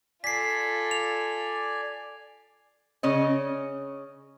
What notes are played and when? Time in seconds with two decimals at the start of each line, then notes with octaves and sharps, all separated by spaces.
0.24 F4 A4 D5 G#5 B6 C7
0.91 F7
3.03 C#3 C#4 D#5